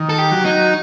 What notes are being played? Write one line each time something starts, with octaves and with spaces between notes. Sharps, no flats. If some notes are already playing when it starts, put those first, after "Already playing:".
Already playing: D#3
A4
G4
F#3
D#4